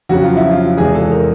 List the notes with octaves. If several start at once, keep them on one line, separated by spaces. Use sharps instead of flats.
F2 C#3 F#3 F#4
F4
E4
F4
E2 C3 E3 G#3 G#4
A4
A#4